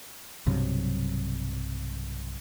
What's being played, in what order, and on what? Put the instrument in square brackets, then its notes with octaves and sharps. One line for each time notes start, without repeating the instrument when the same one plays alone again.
[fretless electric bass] B1 G2 C3 F#3